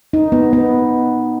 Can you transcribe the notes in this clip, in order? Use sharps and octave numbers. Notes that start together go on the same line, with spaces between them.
D#4
B3
B3